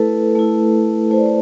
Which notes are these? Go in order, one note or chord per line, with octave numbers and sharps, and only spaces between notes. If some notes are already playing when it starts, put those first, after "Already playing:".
Already playing: A3 E4 A4 B4
A3 E4
A3 E4 C5
D5
C5